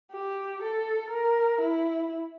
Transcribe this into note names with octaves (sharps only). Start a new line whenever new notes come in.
G4
A4
A#4
E4